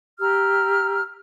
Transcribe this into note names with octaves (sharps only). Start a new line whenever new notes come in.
G4 A#5 E6 F6